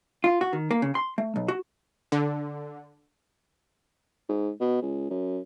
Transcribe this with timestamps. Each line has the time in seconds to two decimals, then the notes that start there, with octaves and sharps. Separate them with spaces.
0.24 F4
0.41 F#4
0.53 D#3
0.71 A#3
0.82 C#3
0.95 C6
1.18 A3
1.36 B1
1.48 F#4
2.12 D3
4.29 G#2
4.60 B2
4.82 C#2
5.10 F#2